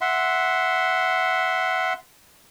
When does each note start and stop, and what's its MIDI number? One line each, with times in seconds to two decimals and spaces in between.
0.01 1.93 76
0.01 1.93 78
0.01 1.93 84